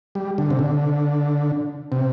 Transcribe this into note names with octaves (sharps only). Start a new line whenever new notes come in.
G3
D3
C3
D3
C3